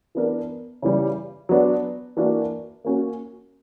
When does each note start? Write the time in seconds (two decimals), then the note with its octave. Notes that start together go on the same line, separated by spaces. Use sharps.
0.15 E3 B3 D4 A#4
0.82 C#3 E3 G3
1.49 F#3 B3 D4
2.17 E3 A#3 D4 F#4 A#4
2.85 A#3 C#4 F#4